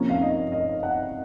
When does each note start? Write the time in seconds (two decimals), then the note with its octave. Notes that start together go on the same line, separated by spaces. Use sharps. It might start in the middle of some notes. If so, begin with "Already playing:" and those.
Already playing: C3 F3 A#3 C#4
0.09 F5
0.22 D#5
0.52 D#5
0.83 F#5